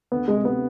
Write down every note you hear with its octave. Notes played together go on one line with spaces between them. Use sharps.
D2 B3
C3 G#3
C3 B3